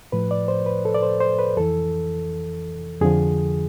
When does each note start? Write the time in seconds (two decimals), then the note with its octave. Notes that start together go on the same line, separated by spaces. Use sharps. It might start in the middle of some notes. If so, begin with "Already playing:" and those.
0.12 A2 F3 B4
0.31 D5
0.48 C5
0.66 B4
0.85 A4
0.95 D5
1.03 C5
1.20 C5
1.39 B4
1.57 F2 E3 A4
3.01 F2 D3 F3 G#4